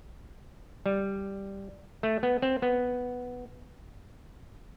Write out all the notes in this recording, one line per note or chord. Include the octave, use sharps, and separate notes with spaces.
G3
A3
B3
C4
B3